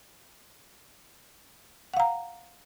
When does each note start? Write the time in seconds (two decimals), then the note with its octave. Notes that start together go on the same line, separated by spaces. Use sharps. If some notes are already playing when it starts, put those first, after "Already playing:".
1.94 F#5
1.97 F5
2.00 A#5